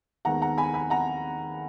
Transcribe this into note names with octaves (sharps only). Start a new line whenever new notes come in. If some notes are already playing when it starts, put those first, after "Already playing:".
D#2 D#3 G#3 B3 F#5 A#5
F#5 A#5
G#5 B5
G#5 B5
F#5 A#5